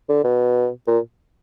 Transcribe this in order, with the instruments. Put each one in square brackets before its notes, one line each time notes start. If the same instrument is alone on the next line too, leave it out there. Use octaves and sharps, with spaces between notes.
[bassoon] D3
B2
A#2